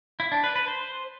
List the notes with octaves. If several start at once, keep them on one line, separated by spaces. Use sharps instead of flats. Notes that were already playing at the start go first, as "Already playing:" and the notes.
E4
D4
B4
B4
C5